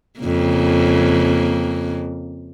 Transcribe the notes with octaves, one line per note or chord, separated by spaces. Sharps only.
F2 C#3 A#3